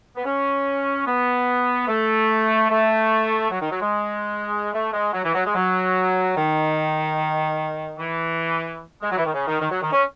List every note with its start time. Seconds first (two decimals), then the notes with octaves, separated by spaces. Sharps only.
0.16 B3
0.25 C#4
1.06 B3
1.88 A3
2.70 A3
3.51 F#3
3.61 D#3
3.71 F#3
3.81 G#3
4.73 A3
4.93 G#3
5.13 F#3
5.24 E3
5.34 F#3
5.45 G#3
5.55 F#3
6.36 D#3
7.98 E3
9.02 G#3
9.10 F#3
9.17 E3
9.26 D#3
9.33 C#3
9.47 D#3
9.61 D#3
9.71 F#3
9.82 D#3
9.92 C#4